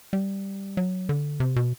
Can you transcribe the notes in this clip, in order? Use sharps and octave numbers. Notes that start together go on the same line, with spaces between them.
G3
F#3
D3
C3
B2